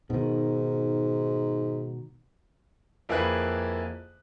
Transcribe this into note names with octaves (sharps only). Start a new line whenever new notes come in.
G#2 B2 D#3
F2 A#3 E4 G#4 B4 F#6